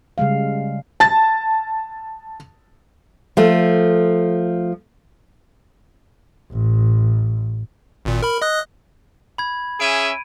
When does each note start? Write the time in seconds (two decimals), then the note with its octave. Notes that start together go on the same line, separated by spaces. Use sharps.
0.18 C#3 G3 G#3 F5
1.00 A5 A6
3.37 F3 A3
6.52 A1
8.05 G#1 A#2
8.22 A#4 B5
8.42 D#5 D#6 F#6
9.38 B5 G#6
9.80 C#4 G#4 E5 D7 D#7